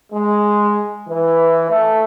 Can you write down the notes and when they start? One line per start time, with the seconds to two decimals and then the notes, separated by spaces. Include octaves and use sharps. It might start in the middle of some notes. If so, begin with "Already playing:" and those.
0.12 G#3
1.09 E3
1.69 A3